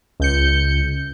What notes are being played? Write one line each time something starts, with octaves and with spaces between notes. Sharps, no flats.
C#2 G6 C#7